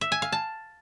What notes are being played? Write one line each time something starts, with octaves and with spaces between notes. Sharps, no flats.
E5
G#5
F5
A5